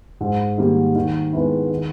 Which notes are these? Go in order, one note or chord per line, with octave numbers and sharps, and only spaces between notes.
G#2
D#3 G3 A#3
D#3
G#3 B3 E4
D#3